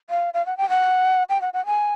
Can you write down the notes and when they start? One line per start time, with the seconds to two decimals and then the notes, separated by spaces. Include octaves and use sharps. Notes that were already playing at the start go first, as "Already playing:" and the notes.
0.10 F5
0.34 F5
0.46 F#5
0.57 G5
0.70 F#5
1.30 G5
1.41 F#5
1.54 F#5
1.66 G#5